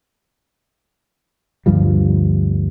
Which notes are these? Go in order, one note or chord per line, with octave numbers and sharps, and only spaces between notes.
D2 G2 F3 G3